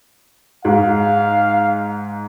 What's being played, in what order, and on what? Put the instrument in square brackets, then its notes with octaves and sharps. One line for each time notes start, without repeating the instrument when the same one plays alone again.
[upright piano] G#2 [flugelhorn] F5